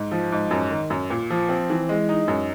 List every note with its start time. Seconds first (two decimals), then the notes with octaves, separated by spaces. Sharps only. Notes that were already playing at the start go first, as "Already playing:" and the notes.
Already playing: G#2
0.12 F3
0.32 G#2
0.51 F#2
0.70 D#3
0.90 F#2
1.10 A#2
1.30 F3
1.49 C4
1.70 E3
1.89 G#3
2.09 D#4
2.28 F#2